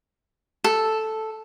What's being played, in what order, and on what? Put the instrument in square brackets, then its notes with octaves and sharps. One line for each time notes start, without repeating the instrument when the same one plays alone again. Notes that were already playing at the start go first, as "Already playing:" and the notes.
[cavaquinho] A4